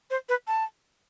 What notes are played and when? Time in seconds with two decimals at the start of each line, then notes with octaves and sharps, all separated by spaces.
0.10 C5
0.29 B4
0.47 A5